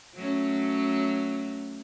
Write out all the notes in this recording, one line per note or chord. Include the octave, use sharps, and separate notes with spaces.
F#3 A3 C#4